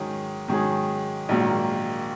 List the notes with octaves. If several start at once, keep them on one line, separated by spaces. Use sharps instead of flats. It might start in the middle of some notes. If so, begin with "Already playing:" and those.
Already playing: G#2 D#3 F#3 C#4 G#4
G#2 D#3 F#3 C#4 G#4
A#1 G#2 D#3 F#3 A#3